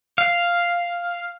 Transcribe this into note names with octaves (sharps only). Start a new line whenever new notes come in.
F5